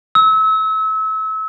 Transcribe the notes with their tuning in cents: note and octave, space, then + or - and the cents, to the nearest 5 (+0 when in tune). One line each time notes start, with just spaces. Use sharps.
E6 -30